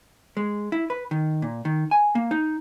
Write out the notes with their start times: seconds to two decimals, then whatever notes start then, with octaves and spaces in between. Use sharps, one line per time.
0.37 G#3
0.72 E4
0.90 B4
1.11 D#3
1.42 A#2
1.65 D#3
1.91 G#5
2.15 A#3
2.31 D#4